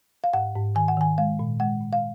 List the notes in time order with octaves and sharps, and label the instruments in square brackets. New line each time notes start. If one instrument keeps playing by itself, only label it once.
[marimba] F5
G#2 F#5
G#2
D#3 G#5
F#5
D#3 G#5
G#3 F5
A#2
G#3 F#5
A#2
F5